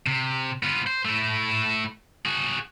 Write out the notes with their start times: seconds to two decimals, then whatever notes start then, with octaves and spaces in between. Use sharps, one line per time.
0.07 C3
0.63 B3 F4
0.87 C5
1.05 A3 E4
2.26 F#4 G#4